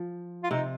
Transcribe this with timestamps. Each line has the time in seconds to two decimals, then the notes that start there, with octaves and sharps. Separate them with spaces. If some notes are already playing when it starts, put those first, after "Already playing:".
Already playing: F3
0.43 F4
0.51 C3 D#4